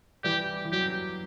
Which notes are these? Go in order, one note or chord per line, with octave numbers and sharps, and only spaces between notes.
E3 G3 G4
E3
F#3 G4